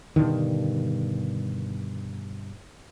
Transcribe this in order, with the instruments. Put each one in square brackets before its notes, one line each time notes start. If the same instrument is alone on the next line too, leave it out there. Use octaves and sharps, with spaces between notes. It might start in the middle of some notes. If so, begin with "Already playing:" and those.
[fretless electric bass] G2 B2 D3 D#3